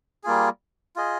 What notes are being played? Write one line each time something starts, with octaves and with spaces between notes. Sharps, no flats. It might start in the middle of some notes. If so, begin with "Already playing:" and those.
G3 A#3 F4 G#4
F4 G#4 D#5